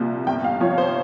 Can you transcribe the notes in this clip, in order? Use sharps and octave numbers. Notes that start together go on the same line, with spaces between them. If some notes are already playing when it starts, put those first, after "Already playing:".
Already playing: C2 A#2 F3
G1 G5
F5
F3 C#5
C5